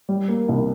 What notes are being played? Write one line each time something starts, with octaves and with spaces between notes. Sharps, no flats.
G3
A#3
C2